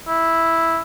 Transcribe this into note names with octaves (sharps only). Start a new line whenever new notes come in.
E4